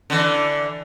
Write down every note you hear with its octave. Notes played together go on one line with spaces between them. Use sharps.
D3 E3